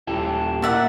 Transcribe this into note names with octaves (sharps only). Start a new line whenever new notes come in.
D#1 E4 G4 A4
A#2 D5 E5 F#5